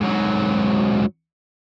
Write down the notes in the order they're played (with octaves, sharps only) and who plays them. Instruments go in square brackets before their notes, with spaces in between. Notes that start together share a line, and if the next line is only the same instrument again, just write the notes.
[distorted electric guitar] G#2 F#3